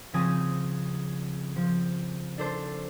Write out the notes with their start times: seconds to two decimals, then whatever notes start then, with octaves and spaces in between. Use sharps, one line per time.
0.14 C#3 F3 C4 C#4 G#5 D#6
1.56 F3
2.38 D4 A4 C5